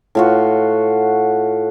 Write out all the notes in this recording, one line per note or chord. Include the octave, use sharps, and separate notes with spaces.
A2 F4 F#4